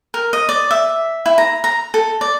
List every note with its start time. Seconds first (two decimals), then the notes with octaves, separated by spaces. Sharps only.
0.14 A#4
0.33 D#5
0.49 D5
0.71 E5
1.26 E4
1.38 A#5
1.64 A#5
1.94 A4
2.21 D5